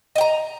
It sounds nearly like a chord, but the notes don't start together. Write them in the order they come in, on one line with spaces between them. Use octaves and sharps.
D#5 G5 A#5